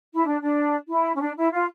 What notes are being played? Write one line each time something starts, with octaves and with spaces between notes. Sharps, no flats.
E4
D4
D4
E4
C#4
D4
E4
F4